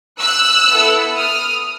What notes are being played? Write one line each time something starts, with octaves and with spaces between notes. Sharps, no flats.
E6 F#6
B3 E4 A4
D#6 F6